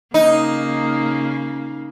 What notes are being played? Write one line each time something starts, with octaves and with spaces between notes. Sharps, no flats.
C#3 A#3 D#4